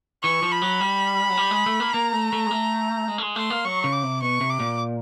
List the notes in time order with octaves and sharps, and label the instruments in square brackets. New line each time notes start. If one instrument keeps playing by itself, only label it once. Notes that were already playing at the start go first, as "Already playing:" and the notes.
[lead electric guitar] E3 [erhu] C#6
[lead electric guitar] F3
[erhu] B5
[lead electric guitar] F#3
G3
F#3
G3
G#3
A3
A#3
[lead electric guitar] A#3 [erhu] A#5
[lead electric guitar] A3
A3
G#3
A3
G#3
A3
G#3
[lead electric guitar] A3 [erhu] C6
[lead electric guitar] A#3
[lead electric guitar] F#3 [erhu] C#6
[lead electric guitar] C#3
[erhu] D6
[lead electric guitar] C3
[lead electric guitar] B2 [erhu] C#6
[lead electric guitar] C3
[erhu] D6
[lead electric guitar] A#2